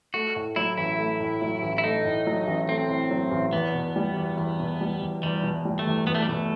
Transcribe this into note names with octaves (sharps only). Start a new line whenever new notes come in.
A3 F#4
A2
F#3 E4
A1 E4
A3
A2
F#3
A1
E4
A3 D#4
A2
F#3
A1
A3 C4
A2
F#3
A1
E2 B3
B2
G3
E2
E2
B2
G3
E2
E2 G3
B2
G3
A3
E2
E2 B3
A3
G3
B2 A3